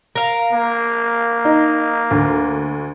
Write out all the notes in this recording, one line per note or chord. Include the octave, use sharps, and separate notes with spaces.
A#4 F5
A#3
D#4
D2